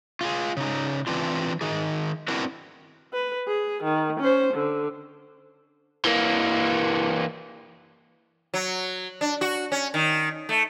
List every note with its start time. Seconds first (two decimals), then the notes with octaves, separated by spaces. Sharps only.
0.21 F4 F#4 G#4
0.57 C#3 D#4
1.07 E3 C4 D4 F4
1.61 D#3 G#4
2.28 C4 D4 E4 F#4 A#4 B4
3.13 B4
3.47 G#4
3.84 D#3
4.20 C#4 C5
4.54 D3
6.05 E3 A#3
8.54 F#3
9.21 D4
9.41 F#4
9.72 C#4
9.94 D#3
10.49 A3